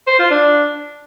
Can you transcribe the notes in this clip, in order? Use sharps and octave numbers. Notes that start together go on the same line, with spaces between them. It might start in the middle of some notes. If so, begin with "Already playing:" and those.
C5
F4
D4